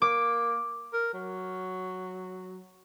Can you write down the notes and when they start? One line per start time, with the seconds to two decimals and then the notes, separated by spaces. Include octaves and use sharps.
0.02 A#3 D6
0.93 A#4
1.14 F#3